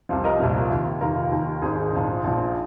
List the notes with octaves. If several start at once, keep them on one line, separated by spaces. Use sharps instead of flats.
C2 C3 F3 F4
A#4 D#5
C2 A#2 F3
D#2 D#3
F1 D#2 D#3 F4 A#4
D#2 D#3
G#1 G#2 D#3 D#4 G#4
A#1 G#2 F3
A#1 A#2 F3